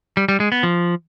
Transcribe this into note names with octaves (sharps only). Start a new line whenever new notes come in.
G3
G3
G#3
B3
F3